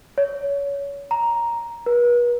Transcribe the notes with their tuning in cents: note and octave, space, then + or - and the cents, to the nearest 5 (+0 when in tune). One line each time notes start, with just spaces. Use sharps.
C#5 +25
A#5 +5
B4 -40